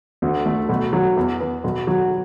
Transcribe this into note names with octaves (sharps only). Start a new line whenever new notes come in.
D2
A3
B1
F#3
E2
B3
B1
F#3